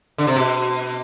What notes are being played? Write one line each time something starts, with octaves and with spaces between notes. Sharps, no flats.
D3
C3
B2